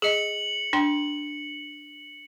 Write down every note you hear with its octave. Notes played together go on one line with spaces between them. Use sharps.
G#4 D#5 C#7 F#7
D4 G5 C6